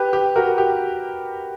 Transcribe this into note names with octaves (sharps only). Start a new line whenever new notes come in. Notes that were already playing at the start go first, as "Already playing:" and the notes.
Already playing: G4 B4
G4
F#4 A#4
G4